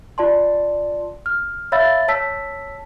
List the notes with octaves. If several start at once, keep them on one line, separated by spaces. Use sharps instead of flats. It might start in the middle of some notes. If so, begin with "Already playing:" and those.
F4 D5 A5 C6
F6
C#5 E5 F5 B5 E6 A6
C#5 A5 E6 B6